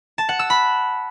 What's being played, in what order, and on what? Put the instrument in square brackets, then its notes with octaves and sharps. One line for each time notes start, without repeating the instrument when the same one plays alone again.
[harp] A5
F#5
E6
B5